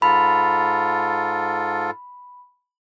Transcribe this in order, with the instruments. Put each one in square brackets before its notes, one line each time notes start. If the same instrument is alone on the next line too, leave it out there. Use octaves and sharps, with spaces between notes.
[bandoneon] G#2 F4 A4 [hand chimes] B5